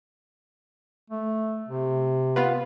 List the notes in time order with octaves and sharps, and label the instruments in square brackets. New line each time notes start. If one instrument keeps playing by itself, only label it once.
[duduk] A3
C3
[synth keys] B3 F4 B4